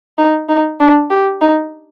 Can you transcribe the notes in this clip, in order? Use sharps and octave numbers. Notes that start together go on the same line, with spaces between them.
D#4
D#4
D4
G4
D#4